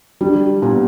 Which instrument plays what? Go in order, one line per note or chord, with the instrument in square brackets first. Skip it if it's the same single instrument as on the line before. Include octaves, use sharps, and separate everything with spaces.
[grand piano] G3 [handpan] D4
[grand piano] A#2 [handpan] B3